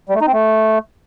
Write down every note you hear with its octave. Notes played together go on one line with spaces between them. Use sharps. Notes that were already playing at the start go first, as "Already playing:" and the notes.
G3
A3
D#4
C4
A3